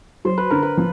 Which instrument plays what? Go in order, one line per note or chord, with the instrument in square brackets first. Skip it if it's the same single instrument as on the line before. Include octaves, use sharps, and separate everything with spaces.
[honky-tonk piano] F#3 [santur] C5
[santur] B4
[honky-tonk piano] D3 [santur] A#4
[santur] B4
[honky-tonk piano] F3